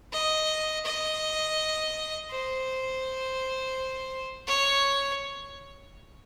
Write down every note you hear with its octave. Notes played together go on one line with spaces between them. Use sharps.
D#5
D#5
C5
C#5